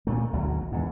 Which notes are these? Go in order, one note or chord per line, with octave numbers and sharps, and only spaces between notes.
A#2 A3
G#1 D2 B2 F#3
E2 G#2